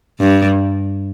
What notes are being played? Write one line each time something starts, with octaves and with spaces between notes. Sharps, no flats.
G2